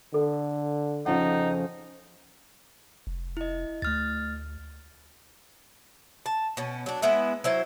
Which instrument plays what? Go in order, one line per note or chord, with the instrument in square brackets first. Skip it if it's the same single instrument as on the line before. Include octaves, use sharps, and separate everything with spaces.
[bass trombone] D3 [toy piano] A4
[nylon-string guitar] F2 C#3 F3 [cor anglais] D#4 [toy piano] F#5
[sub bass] F1
[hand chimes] E4 D#5
[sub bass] D2 [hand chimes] A3 F6 A6
[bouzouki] A5
B2 C#4
F#3 D4
G#3 B3 E4 E5
F#3 E4 C5